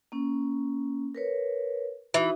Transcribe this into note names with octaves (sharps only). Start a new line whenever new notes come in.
A#3 C#4
A#4 B4 C#5
E3 D#4 F#4